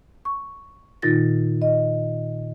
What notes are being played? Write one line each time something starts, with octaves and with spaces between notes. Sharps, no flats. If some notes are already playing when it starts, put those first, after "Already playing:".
C#6
A#2 D#3 D#4 F4 A6 A#6
D#5